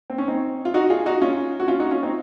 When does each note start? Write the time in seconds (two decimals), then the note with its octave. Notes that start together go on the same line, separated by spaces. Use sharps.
0.10 C4
0.18 C#4
0.28 C4 D#4
0.65 F4
0.74 D#4 F#4
0.90 F4 G#4
1.06 D#4 F#4
1.22 C#4 F4
1.60 F#4
1.68 C#4 F4
1.80 D#4 F#4
1.91 C#4 F4
2.03 C4 D#4